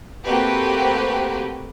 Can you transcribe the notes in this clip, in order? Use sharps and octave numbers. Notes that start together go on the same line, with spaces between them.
A3 A#3 C4 F#4 G4 B4